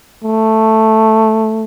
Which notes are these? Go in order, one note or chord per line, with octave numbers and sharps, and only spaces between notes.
A3